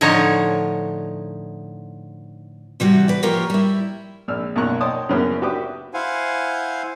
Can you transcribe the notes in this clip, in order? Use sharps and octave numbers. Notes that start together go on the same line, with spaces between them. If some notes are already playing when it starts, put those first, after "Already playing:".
A2 D3 F3 D#4 C#5
C3 E3 G3 F#4
B4 D5
F3 A#3 F4 G4 A#4 C#5
G3 E4
A#1 E6 F6
B1 F#2 A#2 A#5 C#6 F#6
C#5 D#5 G5 A5 C6 D#6
F#2 C#3 A#3 B3 C#4 E4
F#4 G4 B4 E5 D6 D#6
E4 C5 F5 F#5 G#5